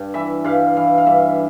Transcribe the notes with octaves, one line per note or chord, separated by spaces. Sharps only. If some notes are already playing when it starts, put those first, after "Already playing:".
Already playing: G2
E3 E5
G2 F5
E3 F5
F5
G2 E5